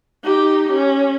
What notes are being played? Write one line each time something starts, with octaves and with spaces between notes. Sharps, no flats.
D#4 G4
C#4